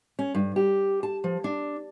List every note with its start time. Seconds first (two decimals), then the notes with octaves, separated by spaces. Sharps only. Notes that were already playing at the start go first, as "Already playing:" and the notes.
0.19 C#4
0.35 G2
0.56 G4
1.03 A5
1.24 F3
1.44 D4